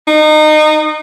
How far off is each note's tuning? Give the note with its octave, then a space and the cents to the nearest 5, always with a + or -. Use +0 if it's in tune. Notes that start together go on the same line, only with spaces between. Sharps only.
D#4 -25